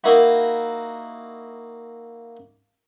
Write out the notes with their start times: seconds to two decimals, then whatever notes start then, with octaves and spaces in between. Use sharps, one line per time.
0.04 A#3 D#4 E4 F#4